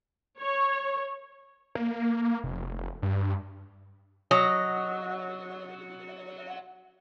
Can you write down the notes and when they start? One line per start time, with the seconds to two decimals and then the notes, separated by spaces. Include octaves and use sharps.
0.38 C#5
1.75 A#3
2.44 F1
3.02 G2
4.31 F#3 D#5